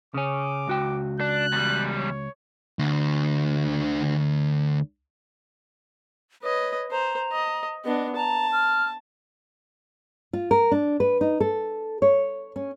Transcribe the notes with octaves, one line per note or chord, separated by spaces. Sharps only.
C#3 C#4 D6
C#2 F#4 G5
D4 F#6
E2 G3
C#5
D2 D3
B4 C#5 D#5
C5 A#5
D#5
B3 D4 D#5
A5 A#5
F6
F4
A#4
D4
B4
D#4
A4
C#5
C#4